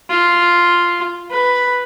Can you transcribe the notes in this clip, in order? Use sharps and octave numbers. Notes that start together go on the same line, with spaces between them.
F4
B4